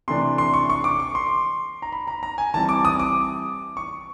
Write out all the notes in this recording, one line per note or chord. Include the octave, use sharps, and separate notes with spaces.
C3 E3 A3 D4 C6
C6
C#6
C#6
D6
C#6
C6
A#5
B5
A#5
A#5
G#5
E3 G3 C4 A5
D6
D#6
D6
C#6